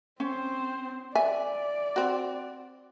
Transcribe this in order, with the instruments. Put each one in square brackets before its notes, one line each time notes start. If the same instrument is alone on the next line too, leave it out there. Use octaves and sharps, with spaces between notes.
[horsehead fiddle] C4 C5 [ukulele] C#4
[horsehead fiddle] D5 [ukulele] E5 [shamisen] G#5
[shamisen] C4 F#4